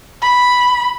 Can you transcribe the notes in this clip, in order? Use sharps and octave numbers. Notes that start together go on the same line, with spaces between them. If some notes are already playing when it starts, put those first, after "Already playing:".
B5